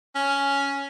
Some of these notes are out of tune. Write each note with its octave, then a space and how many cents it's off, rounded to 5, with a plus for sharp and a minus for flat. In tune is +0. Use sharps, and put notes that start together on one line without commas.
C#4 +5